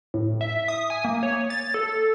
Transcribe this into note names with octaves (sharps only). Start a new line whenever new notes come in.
A2
E5
D#6
G#5
A#3
C#5
A6
A4